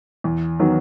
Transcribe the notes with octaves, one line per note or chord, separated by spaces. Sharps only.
E2
D#3 F#3 B3